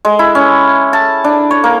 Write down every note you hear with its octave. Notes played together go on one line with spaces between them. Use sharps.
G#3
E4
C#4
A5
D4
C#5
A#3